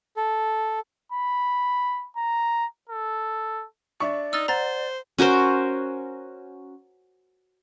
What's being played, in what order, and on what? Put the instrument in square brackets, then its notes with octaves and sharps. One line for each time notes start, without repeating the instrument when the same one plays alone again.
[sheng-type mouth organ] A4
[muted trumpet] B5
A#5
A4
[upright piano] D4 E5 C#6 [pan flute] D5
[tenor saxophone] D#4 [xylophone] E6 F6 A6
[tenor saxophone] C5 [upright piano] F#5 [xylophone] A#5 A6
[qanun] C#4 F#4 A#4 C5